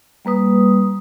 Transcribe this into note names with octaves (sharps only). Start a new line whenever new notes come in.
G3 A#3 B4 D#6